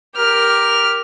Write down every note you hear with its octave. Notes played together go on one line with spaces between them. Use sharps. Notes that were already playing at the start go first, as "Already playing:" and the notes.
G4 A#4 F6